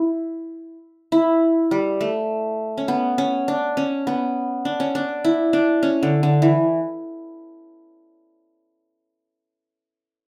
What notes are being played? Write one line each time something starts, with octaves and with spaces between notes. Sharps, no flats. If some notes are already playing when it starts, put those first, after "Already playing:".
Already playing: E4
E4
G3
A3
C#4
B3
C#4
D4
C#4
B3
D4
C#4
D4
E4
D4
C#4
D3
D3
E3